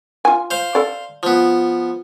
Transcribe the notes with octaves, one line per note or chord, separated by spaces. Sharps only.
F4 G#5
C5 F5
A4 D5
F3 B3